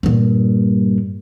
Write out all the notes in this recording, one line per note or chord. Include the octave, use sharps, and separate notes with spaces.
G2 A#2